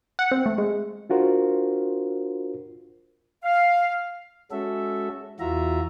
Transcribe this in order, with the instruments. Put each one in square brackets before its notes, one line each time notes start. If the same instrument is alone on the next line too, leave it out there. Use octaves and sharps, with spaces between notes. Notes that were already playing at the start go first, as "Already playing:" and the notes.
[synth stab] F#5
C4
A3
G#3
[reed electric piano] D4 F4 F#4 A#4 C5
[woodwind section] F5
[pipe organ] G#3 C#4 F#4 A4 E5
E2 E3 F4 F#4 E5 A#5